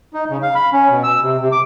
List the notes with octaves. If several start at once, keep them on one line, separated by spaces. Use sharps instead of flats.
D#4
C#3
F5
B5
C#4
B2
E6
C3
C3
D6